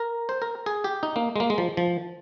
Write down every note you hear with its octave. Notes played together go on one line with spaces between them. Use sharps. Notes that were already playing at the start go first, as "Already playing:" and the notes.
Already playing: A#4
C5
A#4
G#4
G4
D#4
A#3
G#3
A#3
G#3
F3
F3